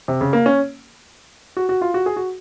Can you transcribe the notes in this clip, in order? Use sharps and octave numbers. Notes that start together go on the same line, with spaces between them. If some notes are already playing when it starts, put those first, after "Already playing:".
C3
C#3
A#3
C#4
F#4
F#4
F4
F#4
G#4
F#4